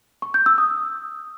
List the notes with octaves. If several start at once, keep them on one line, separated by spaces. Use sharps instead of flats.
C#6
G6
E6
D#6